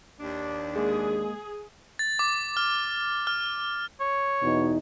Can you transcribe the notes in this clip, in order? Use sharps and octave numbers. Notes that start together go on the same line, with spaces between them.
D#2 D4
G#3 A#3 G#4
A6
D6
F6
F6
C#5
E2 B2 D#4